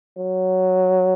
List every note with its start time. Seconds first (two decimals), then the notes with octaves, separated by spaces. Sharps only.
0.19 F#3